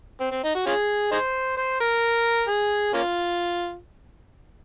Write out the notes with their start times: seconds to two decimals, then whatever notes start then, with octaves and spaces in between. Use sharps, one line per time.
0.21 C4
0.31 C4
0.44 D#4
0.55 F#4
0.67 C#4 F4 G#4
1.12 D#4 G#4 C5
1.57 C5
1.80 A#4
2.48 G#4
2.94 A#3 C#4 F4